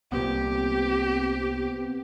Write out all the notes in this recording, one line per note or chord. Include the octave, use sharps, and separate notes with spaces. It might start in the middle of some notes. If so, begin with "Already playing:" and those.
C2 A#2 B3 C4 G4